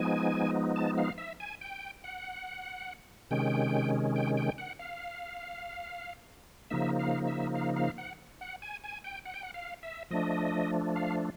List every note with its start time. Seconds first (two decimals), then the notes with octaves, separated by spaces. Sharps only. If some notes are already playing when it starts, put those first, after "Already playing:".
Already playing: F3 G#3 B3 D#4 G#5
0.76 A5
0.98 F5
1.18 E5
1.40 G#5
1.61 G5
2.04 F#5
3.31 C3 D#3 G#3 C#4 G5
4.16 G5
4.37 G5
4.58 F#5
4.79 F5
6.70 C#3 F3 A#3 D#4 E5
6.99 F5
7.27 E5
7.55 F5
7.76 F5
7.98 F#5
8.41 F#5
8.62 G#5
8.84 G#5
9.04 G5
9.26 F#5
9.34 G5
9.43 F#5
9.54 F5
9.83 E5
10.10 F3 A3 D4 D#5
10.96 F5